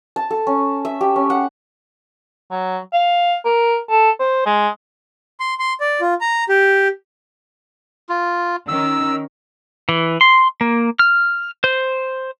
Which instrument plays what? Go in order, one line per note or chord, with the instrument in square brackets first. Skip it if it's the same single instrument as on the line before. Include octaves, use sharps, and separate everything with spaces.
[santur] A5
A4
C#4
E5
G4
C#4
F#5
[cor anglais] F#3
F5
A#4
A4
C5
G#3
[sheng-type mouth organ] C6
C6
D5
F4
A#5
G4
[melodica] F4
[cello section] D#3 C#4 A#4 [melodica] E6
[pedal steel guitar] E3
C6
A#3
F6
C5